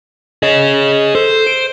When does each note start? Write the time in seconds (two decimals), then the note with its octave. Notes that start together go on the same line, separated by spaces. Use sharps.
0.43 G#4 C#5 D#5
1.15 A4 C5
1.47 D7